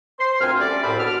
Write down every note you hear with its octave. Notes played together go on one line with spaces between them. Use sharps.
C5 C6
D2 A#2 C4 G#5 F6
G3 A3 C#4 D5
C2 F#2 A2 C4 A5 B5
B2 D3 D6 F6